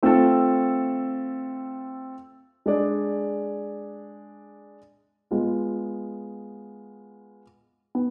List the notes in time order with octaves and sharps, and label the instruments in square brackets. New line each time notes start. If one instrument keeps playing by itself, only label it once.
[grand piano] A3 C4 F4 A4
G#3 D4 G#4 D5
G#3 B3 F4
B3